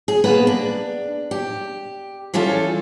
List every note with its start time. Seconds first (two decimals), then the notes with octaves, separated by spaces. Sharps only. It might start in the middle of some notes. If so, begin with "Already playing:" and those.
0.08 G#4
0.24 A#3 B3 B4
0.47 D4
1.31 G4
2.34 E3 G3 C#4 F4 A4